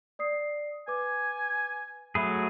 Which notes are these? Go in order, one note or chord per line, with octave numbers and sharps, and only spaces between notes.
D5 D#6 C7
B4 G#5 D6
F#3 A3 G#4 E5 B5